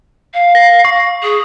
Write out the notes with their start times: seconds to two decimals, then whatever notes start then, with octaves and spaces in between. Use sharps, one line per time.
0.34 F5
0.55 A#6
0.85 C#6
1.23 G#4